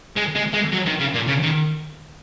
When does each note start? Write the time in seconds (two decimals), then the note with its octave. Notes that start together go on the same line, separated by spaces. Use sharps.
0.16 G#3
0.35 G#3
0.54 G#3
0.73 F#3
0.86 D#3
1.00 C#3
1.14 A#2
1.28 C#3
1.43 D#3